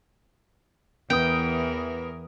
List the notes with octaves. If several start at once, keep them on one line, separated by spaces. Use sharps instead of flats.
E2 E3 B3 A#4 G5 D#6